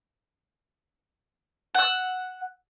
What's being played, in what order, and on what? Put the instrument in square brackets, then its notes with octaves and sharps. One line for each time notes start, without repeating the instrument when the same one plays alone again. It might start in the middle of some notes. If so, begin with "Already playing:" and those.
[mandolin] F#5 E6